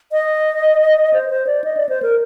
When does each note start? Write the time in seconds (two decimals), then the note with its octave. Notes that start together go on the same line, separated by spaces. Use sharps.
0.12 D#5
1.14 C5
1.30 C5
1.47 D5
1.64 D#5
1.77 D5
1.89 C5
2.02 A#4